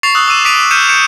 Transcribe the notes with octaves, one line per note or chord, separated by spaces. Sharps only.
C#6 A6 C7 F7
D#6 E6 F#6 C7
D6 E6 D#7 E7
D6 B6 C7 D7 D#7 F7
D6 F6 G6 C#7 D#7 E7
G6 C#7 D7 E7